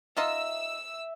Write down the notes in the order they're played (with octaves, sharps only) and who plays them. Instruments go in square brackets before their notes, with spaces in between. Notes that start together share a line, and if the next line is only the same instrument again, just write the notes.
[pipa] D#4 F4 D#5 [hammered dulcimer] E5 [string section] E6